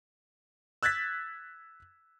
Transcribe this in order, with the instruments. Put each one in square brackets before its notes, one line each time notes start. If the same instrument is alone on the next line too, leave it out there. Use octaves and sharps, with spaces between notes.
[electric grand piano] E6 F#6 G#6 A6 B6